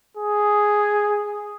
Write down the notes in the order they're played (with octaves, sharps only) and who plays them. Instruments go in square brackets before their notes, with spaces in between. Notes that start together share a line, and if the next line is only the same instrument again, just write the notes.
[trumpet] G#4